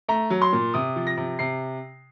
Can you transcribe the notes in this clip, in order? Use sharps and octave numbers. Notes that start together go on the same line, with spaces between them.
A3 A#5
F#3
C6
A#2
C3 D#6
F3
A#6
C3
C3 C7